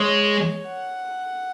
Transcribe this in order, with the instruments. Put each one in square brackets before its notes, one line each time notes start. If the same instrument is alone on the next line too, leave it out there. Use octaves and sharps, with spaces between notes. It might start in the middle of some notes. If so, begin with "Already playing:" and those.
Already playing: [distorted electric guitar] G#3 [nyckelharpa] C#5
[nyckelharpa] F#5